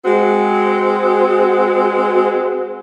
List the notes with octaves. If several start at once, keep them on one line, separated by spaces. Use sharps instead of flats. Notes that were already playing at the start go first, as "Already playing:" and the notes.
G#3 C4 F#4